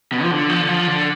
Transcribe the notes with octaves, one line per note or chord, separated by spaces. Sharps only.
B2
F3
D3
F3
D3
F3
D3